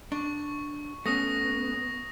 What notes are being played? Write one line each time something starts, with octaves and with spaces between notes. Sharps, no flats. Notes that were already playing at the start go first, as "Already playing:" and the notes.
D4 C#6
A3 B3 C#4 D#6 A#6